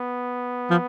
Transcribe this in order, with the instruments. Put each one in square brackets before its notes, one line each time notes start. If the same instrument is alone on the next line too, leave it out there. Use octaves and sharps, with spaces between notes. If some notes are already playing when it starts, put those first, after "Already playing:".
Already playing: [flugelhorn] B3
[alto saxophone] F3